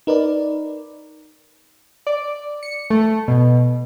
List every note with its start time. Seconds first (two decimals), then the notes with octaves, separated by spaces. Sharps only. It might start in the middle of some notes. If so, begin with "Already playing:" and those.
0.07 D#4 A#4 B4 D5
2.07 D5
2.63 C#7
2.90 A3
3.28 B2